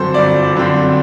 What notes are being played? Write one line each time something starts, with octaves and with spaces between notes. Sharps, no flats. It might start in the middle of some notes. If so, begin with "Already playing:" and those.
Already playing: G1 F#2 D3 F#3 C4 A4 C5
G1 D5
F#2 D3 F#3 C4